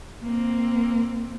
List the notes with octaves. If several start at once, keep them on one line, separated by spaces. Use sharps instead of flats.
A#3 C4